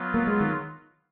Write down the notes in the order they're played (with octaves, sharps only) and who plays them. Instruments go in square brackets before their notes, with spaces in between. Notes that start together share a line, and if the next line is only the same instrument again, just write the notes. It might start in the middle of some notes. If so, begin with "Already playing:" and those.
Already playing: [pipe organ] F#3 B3 F4
[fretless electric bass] A#3
G#3
D#3